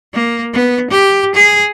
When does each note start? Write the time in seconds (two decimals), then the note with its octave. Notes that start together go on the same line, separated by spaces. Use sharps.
0.14 A#3
0.53 B3
0.90 G4
1.35 G#4